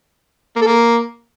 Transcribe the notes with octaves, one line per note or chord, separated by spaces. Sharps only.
A#3
A4
A#3